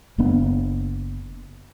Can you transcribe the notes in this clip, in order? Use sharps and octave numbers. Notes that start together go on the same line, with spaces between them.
F#1 A#3 B3 D4